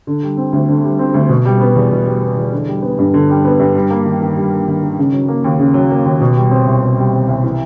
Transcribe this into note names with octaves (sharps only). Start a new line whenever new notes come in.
D3
G3
C4
D2
D3
G3
C4
D2
B2
G3
B3
E2
B2
G3
B3
E2
D3
G3
B3
G2
D3
G3
B3
G2
G3
A#3
D#3
D#3
G3
A#3
D#3
D#3
C#3
F#3
A#3
D#2
C#3
F#3
A#3
D#2
B2
G3
C4
C2
B2
G3
C4
C2
E3